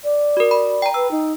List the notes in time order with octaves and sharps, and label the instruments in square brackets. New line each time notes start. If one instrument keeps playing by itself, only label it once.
[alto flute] D5
[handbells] F#4 A#4
B5
G5 A#5
[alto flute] B4 [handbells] E6
[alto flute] D#4